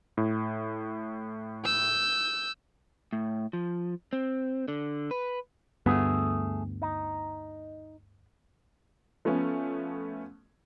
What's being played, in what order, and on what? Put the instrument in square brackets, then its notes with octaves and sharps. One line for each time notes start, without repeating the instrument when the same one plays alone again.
[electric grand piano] A2
[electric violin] E6 G6
[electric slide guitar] A2
F3
C4
D3
B4
[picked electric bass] D2 G2 B3 [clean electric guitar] A3 G#4
[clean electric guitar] D#4
[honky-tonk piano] F3 A3 B3 C#4